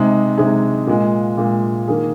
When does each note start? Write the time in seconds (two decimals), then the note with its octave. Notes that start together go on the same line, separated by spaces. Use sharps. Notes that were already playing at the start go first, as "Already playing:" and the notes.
Already playing: C3 G#3 D#4 G#4
0.38 C3 G#3 D#4 G#4
0.87 A#2 G#3 F4
1.37 A#2 G#3 F4
1.88 D#3 A#3 G#4